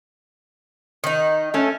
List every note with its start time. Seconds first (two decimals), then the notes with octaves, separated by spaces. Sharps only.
1.04 D#3 D#4
1.54 A3 C#4